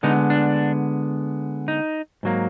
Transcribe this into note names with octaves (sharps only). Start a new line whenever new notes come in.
D3 G#3 B3 D#4
D4
D#4
G#2 F#3 A#3